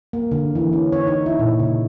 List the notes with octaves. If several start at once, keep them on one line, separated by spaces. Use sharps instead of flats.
A#3
D3
E3
C#4
C#5
D#4
E4
A#2
C#3